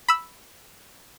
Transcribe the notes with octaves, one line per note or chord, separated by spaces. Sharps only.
B5 E6